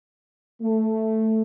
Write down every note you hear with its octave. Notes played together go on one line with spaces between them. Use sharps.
A3